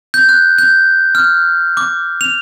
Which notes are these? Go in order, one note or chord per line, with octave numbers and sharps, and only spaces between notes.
G6
F#6
G6
F6
D6
F7